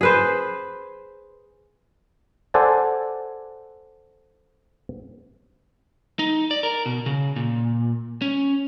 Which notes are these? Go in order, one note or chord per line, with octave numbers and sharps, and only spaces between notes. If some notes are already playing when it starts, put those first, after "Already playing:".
G#4 B4 C5
A4 C5 D5 F#5 G#5 A5
D#4
D5
A#4
B2
C#3
A#2
C#4